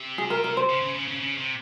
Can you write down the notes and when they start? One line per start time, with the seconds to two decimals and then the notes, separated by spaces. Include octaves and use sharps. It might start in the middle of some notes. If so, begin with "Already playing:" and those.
Already playing: C3
0.18 G#4
0.30 A#4
0.44 A#4
0.57 C5
0.69 C#3
0.82 C#3
0.95 C#3
1.08 C#3
1.20 C#3
1.38 C3